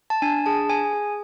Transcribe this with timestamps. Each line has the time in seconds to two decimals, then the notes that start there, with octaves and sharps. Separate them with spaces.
0.10 A5
0.22 D4 G#5
0.46 G#4 A5
0.69 G#4 G#5
0.93 G#4